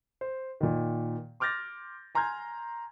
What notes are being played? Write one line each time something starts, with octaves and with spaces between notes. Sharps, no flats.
C5
A#2 D#3
C6 D6 F6 G6 A6 A#6
G#5 A#5 C6 F6 G6 G#6